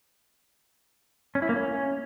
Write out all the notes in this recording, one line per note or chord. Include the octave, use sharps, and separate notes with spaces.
C#4
E4
A#3
C#4